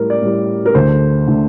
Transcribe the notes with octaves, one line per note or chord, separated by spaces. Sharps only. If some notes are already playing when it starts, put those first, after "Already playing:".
Already playing: A2 G3 A#4
D5
A2 G3
A#4
D2 D3 A3 C5
D3 A3